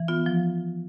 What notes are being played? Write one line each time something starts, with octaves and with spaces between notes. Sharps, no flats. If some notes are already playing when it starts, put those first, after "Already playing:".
Already playing: E3
B3 F4
F3